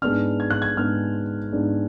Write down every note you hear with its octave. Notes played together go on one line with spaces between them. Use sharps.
G#2 G#3 B3 D4 F6
G#6
F#6
G#6
G#2 G#3 B3 D4 F6
G#2 G#3 B3 D4